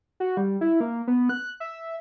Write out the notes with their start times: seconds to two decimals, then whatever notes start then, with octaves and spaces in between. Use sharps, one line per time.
0.20 F#4
0.37 G3
0.61 E4
0.80 A#3
1.07 B3
1.29 F#6
1.60 E5